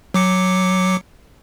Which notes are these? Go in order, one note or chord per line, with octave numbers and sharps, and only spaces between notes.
F#3 D6 C#7